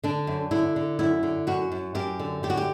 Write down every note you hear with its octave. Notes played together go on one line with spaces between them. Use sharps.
D3 D4
F#2
D3 E4
D3
F#2 E4
D3
F#2 F#4
F#2
F#2 G4
D3
F#2 G4
F#4
G4